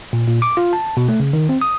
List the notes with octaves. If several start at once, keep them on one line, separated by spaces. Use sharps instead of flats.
A#2
A#2
D6
F4
A5
B2
A3
C#3
D#3
C4
D#6